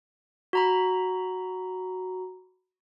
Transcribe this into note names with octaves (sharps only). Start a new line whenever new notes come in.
F#4 A#5 B5